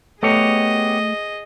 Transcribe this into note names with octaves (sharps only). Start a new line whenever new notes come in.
A3 B3 G4 G#4 C#5 D#5